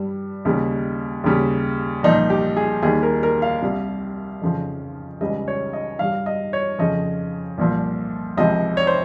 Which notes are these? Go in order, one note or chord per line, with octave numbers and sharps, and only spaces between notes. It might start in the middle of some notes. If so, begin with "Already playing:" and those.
Already playing: G2 G3
D#2 C#3 G3
D#2 C#3 G3
C2 A#2 F3 D#4
G4
G#4
D#2 D#3 G3 G#4
A#4
A#4
F5
C2 C3 G3
F2 C#3 F3
C#2 C#3 G3 D#5
C#5
D#5
G2 G3 F5
D#5
C#5
F2 C#3 F3 D#5
C2 A#2 F3
C#2 C3 F3 D#5
C#5
C5